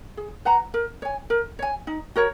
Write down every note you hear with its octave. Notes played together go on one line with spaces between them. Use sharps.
G#4
B4 F#5 A#5
A#4
C#5 G#5
A#4
C#5 G#5
D#4
F#4 A#4 C#5